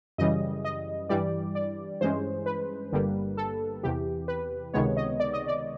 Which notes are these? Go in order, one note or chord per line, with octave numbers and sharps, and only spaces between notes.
F#2 C#3 E3 G3 D#5
D#5
G2 E3 G3 D5
D5
G2 E3 G#3 C#4 C5
B4
G1 G2 D3 G3 A#3
A4
E2 C3 E3 G4
B4
C#2 C3 D#3 G#3 B3 C#5
D#5
D5
D#5
D5